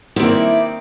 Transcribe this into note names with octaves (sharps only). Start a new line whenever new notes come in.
D#3 A#3 C4 E4 D5